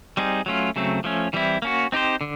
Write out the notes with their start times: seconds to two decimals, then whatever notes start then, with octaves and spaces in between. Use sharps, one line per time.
0.17 G3 C4 D#4 G#4
0.46 F#3 A3 C#4 F4
0.76 C#3 F#3 A3 C4
1.04 F3 A3 C#4
1.33 E3 G3 C4 E4
1.62 A#3 C#4 F#4
1.92 C4 D#4 G4 C5
2.21 D3